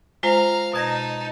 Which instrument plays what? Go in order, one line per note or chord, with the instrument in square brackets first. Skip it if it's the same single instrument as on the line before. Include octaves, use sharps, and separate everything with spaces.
[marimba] G#3 F4 C5 [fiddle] F5 A#5
[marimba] B2 G#6 A#6 [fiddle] D#4 A5